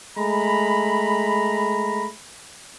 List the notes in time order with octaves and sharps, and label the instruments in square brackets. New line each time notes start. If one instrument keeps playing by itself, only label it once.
[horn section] G#3 A3 A#5 B5